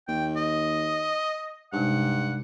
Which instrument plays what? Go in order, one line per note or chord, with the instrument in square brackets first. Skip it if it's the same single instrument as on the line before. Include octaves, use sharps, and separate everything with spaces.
[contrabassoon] D#2 [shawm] G5
[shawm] D#5
[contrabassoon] G2 [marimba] C3 G#3 D#4 [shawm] F#5